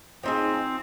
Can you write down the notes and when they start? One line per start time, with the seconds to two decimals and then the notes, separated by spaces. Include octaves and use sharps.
0.23 F3 C4 D#4 G#4